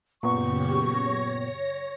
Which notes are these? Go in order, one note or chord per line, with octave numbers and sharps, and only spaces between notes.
F#2 A#2 C#3 B3 G4 C#6
C#5 A#6